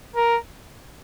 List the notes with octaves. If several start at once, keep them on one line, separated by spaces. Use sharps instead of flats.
A#4